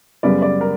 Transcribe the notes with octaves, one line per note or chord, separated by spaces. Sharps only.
F#2 C#3 G3 B3 D5
D5
A#4